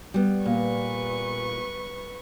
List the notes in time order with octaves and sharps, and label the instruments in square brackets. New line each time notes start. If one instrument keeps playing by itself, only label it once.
[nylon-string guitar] G3 B3
[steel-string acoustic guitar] A#2 [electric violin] B4 C#6